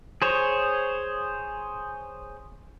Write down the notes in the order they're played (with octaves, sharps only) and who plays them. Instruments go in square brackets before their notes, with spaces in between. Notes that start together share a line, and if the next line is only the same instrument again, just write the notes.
[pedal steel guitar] G#4 C5 C#5